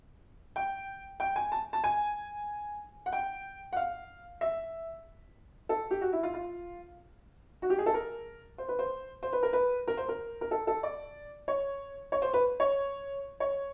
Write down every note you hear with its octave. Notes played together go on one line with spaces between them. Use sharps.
G5
G5
G#5
A5
A5
G#5
F#5
G5
F#5
F5
E5
A4
G4
F#4
E4
F4
F4
F#4
G4
G#4
A4
A#4
C5
B4
C5
C5
B4
A#4
B4
A#4
C5
A#4
A#4
A4
A4
D5
C#5
C#5
C5
B4
C#5
C#5